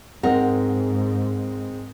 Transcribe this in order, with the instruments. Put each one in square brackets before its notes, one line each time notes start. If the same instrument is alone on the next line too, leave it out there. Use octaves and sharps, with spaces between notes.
[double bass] G#2 [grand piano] G#3 C4 D#4 [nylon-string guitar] A#4 F#5